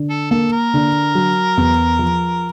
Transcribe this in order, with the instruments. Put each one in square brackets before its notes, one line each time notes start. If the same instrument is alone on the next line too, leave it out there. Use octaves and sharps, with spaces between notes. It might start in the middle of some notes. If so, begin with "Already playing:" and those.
Already playing: [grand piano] D3
[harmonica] A4
[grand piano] A#3 [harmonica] A4
[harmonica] A#4
[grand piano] D3
F#3
E2
F3